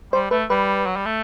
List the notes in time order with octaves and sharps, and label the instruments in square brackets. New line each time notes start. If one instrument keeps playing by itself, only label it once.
[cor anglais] G3 [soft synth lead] C5
[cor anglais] A3 [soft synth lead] B4
[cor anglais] G3 [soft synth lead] B4
[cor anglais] F#3
G3
A3